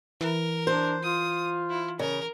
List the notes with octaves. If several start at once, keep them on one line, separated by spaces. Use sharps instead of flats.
E3 A#4
D4 C5
F4 D#6
E4
C#3 A#4